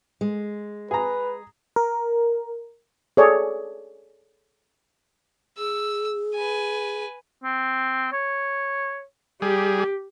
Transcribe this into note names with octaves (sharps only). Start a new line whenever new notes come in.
G#3
G#4 B4 A#5
A#4
G#4 A4 C#5 D5
G#4 E6
B4 G#5
C4
C#5
G3 G4 G#4